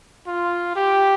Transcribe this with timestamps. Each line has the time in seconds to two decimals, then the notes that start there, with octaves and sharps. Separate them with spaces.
0.27 F4
0.76 G4